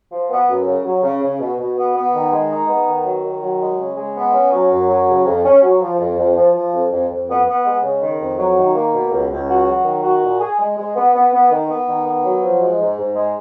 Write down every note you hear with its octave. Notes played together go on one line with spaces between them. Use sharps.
F3
B3
F#2
C#3
F#3
C#3
C#3
B2
B2
B3
B3
D#3
G#3
D#4
B3
D#3
F#3
D#3
F#3
G#3
C#3
G#3
B3
C#4
F#3
F#2
F#3
C#3
F2
C#4
F#3
F3
F2
F2
F3
F3
F2
F2
F2
B3
B3
G#3
C#3
D#3
F2
F#3
D#3
A#3
B2
C#2
C#2
F#4
F#3
D#3
F#4
A#2
G#4
G#3
G#3
B3
B3
B3
D#3
B3
D#3
B3
F#3
F3
G#3
G#2
G#2
G#3